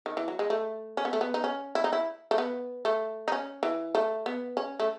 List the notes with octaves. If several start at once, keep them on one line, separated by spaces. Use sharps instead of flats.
D#3
E3
F#3
G#3
A3
C#4
B3
A3
B3
D#4
C#4
E4
D#4
E4
A3
B3
A3
D#4
C#4
E3
A3
B3
C#4
A3